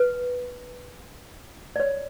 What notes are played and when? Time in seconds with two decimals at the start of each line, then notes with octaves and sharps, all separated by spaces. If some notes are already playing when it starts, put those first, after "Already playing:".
Already playing: B4
1.76 D5
1.80 C#5